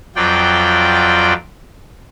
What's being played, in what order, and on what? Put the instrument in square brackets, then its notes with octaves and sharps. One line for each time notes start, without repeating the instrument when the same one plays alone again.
[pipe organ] F2 F#3 F4 D5 G5